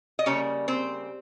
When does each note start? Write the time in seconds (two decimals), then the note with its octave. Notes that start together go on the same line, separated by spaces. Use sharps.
0.19 D#5
0.26 C#3 G3 A#3 C#4 C#5
0.68 C4 C5